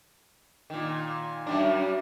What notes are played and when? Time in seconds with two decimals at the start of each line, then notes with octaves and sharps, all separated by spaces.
0.70 A#2 D#3
1.47 F#2 G3 D4